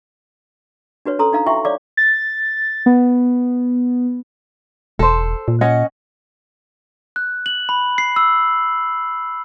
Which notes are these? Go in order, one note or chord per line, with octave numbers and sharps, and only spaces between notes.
D4 F#4 B4 C#5
C#4 A4 A#5 C6 D#6
D4 D#4 F5 A#5
E4 F#4 E5 G5 C6 C#6
C#5 D5 F5 D6
A6
B3
E1 A4 C5
A#2
C#4 D#5 F#5
F#6
F#7
B5
C7
E6